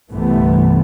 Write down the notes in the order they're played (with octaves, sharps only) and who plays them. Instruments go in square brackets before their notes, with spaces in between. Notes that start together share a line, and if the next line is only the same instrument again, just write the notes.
[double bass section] G1 C2 C3 E3 A3 B3